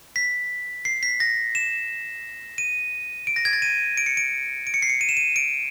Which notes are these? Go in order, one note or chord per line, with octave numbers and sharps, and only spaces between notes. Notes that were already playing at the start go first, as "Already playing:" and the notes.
B6
C7
B6
A#6
E7
D#7
D7
A#6
G#6
A6
D#7
D7
C#7
D7
D7
C#7
C7
C#7
D#7
E7
D#7
D7